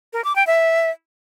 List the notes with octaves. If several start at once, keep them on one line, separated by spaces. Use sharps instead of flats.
A#4
D6
G5
E5